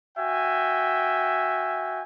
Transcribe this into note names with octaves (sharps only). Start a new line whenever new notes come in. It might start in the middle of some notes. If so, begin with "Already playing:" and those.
F#4 E5 G5 G#5